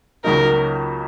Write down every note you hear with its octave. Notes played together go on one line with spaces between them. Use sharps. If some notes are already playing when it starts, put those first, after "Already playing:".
C#2 C#3 F#3 A#3 D#4 A#4